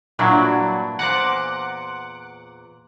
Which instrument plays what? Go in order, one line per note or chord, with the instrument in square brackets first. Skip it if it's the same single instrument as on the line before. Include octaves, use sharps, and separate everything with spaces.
[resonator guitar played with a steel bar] G2 D4 E4 [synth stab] A#2 F#3
[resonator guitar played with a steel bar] E2 A#2 C5 [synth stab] F#5 D6 F#6